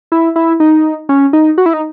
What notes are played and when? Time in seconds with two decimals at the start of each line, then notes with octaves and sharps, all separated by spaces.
0.12 E4
0.36 E4
0.60 D#4
1.09 C#4
1.33 D#4
1.58 F#4
1.66 E4
1.73 D#4